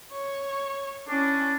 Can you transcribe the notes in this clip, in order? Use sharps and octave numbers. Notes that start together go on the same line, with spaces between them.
C#5
C#4 D4 E4